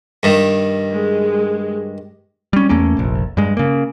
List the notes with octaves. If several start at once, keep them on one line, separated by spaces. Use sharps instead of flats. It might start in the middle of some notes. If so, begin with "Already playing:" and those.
G2 D#3
G#3
G3 C#4
E2 A3 A#3 C#4
F1 A#1
G2 G#3
C#3 A#3